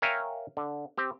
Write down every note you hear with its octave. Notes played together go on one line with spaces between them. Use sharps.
A#4 C#5 E5 F5 G5 G#5
D3
C4 G4